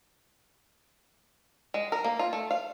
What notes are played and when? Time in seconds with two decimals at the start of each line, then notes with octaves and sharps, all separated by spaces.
1.74 G#3
1.92 A#4
2.04 A#3
2.19 F4
2.33 A3
2.51 F5